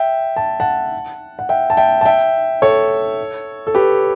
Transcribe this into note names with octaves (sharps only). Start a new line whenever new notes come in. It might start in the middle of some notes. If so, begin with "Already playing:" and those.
Already playing: E5 G5
A5
F#5 A5
F#5
E5 G5
A5
E5 G5
A5
E5 G5
A4 C#5
A4
G4 B4